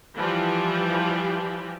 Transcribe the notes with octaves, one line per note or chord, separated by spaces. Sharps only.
E3 F3 G3 G4